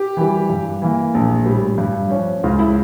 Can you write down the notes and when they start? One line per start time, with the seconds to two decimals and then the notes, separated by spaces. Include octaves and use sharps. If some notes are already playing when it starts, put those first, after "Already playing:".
Already playing: G4
0.17 E3 G3
0.49 G2
0.82 E3 A#3
1.14 A#1
1.46 A2 G3
1.78 G2
2.10 F3 C#4
2.44 C#2 F4
2.59 E4